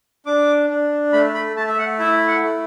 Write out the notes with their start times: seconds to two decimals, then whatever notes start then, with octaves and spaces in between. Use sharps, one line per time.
0.26 D4 D6
0.70 D4
1.13 A3 B5
1.34 B5
1.56 A3 A5
1.67 E5
1.79 F#5
1.99 E4 E5
2.28 F#5
2.43 A3